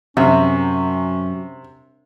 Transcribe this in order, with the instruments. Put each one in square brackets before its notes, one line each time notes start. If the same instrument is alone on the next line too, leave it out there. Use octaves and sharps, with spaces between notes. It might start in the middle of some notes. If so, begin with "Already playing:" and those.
[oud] F#2 [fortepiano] C3 [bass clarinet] C#4